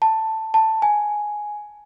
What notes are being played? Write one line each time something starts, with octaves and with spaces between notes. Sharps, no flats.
A5
A5
G#5